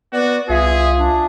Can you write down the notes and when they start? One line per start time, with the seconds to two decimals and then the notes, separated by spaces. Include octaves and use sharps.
0.13 B3 F#4 D5
0.49 C2 F4 G#4 E5
0.98 D4